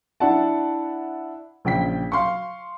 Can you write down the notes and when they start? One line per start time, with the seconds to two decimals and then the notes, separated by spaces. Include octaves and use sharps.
0.20 D4 E4 F#5 A5
1.65 A#1 C#3 G5 B6
2.12 F5 C6 C#6